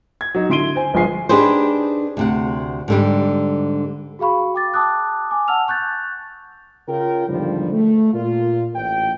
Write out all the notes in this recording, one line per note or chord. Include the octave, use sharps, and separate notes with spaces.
G#6
F#3 D#4
D3 E4 C6 D7 D#7 G7
C5 G#5
G1 F3 G#3 F4 G#5 C7
D4 D#4 G4 G#4 B4 C5
D2 C3 F#5
G#2 D3 G3
F#4 G#4 F5 B5 C#6
G5 D6 A6
G5 A5 D6 D#6 F#6
G#5 D6
F#5 A5 E6 F6 F7
C#6 F#6 G6 A6
C#3 F4 A#4 G5
E2 G#2 D3 F3 G3
A3
A#2 F4
A1 G5